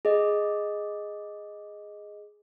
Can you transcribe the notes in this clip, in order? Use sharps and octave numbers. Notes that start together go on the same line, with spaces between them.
G#4 D#5